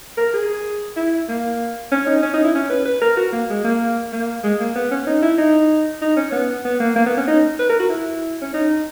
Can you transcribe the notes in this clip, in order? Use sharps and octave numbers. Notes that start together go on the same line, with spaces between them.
A#4
G#4
E4
A#3
C#4
D#4
C#4
D#4
E4
C#4
B4
B4
A#4
F#4
A#3
G#3
A#3
A#3
G#3
A#3
B3
C#4
D#4
E4
D#4
D#4
C#4
B3
B3
A#3
A#3
B3
C#4
D#4
B4
A#4
F#4
E4
C#4
D#4